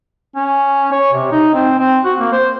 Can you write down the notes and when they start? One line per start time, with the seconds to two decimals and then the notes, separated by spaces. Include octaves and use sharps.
0.36 C#4
0.92 C#5
1.13 C3
1.32 D#4
1.54 C4
1.79 C4
2.05 F#4
2.19 A#3
2.32 C5